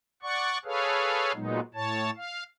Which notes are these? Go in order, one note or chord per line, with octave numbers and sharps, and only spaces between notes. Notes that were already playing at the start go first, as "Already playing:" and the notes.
D5 F#5 C#6
G#4 A4 B4 C#5 F5
A#2 F#3 G#3 B3 D#4
A2 C#5 A5
F5